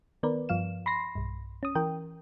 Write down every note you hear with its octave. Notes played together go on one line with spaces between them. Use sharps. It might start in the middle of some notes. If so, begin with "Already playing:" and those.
D#3 B3 A#4 B4 D5
G2 F3 F5 E7
B5 C6 A#6 C7
B1 G2
C#4 D#6
E3 A#4 G5